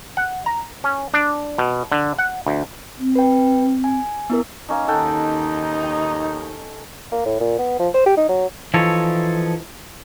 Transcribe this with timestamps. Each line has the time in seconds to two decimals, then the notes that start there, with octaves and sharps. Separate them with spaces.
0.17 F#5
0.46 A#5
0.84 C#4
1.14 D4
1.58 B2
1.92 D3
2.18 F#5
2.47 D2
2.99 C4
3.16 B4 G5
3.84 G#5
4.30 B3 E4 A#4
4.69 A#3 C#4 D#4
4.88 D#2 D#4 A4 F#5 G5
5.83 G5
7.12 A#3
7.25 A2
7.40 A#2
7.58 B3
7.79 F3
7.94 C5
8.06 G4
8.17 D#4
8.29 F#3
8.74 E3 F3 D#4 A4 C#5